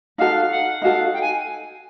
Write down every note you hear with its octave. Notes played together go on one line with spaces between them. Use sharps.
D#4 F#4 A4 F5
F#5
D#4 F#4 A4 F5
G5
G#5